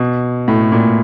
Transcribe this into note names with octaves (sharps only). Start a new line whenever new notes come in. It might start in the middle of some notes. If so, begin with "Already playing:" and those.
Already playing: B2
A2
A#2